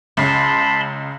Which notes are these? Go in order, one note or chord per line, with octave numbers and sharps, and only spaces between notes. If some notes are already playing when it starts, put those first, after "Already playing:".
C#2 C#3 A5 B5 C6